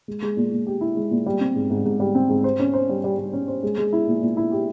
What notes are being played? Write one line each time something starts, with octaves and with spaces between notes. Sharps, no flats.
G#3
G#3
A#2
A#2
G4
E4
G#3
A#2
G3
C4
G#2
G#2
G#2
G3
C4
G#2
C5
C#4
C5
G3
G3
G3
C#4
C5
G#3
G#3
E4
A#2
A#2
E4
G4